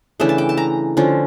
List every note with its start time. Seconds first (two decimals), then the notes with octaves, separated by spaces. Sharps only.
0.20 C#3 E3 A3 D4 E5
0.29 A5
0.38 G5
0.49 A5
0.57 A#5
0.97 D3 F3 C#4